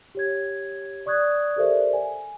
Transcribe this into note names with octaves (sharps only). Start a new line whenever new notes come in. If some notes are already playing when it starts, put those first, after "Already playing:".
G4 C#5 G#6
D5 C#6 D#6 F#6 G#6
G4 A4 A#4 C5 D5 E5
G#5